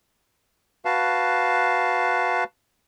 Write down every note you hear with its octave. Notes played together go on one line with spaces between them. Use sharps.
F#4 B4 F5 A5